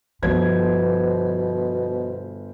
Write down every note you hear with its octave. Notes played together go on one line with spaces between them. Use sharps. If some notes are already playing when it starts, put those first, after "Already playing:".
G1 B2 F3 C5 G#6